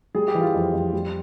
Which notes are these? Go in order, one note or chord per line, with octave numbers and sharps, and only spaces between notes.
G3 G#4
G4
E3
F4
F2
F2
G3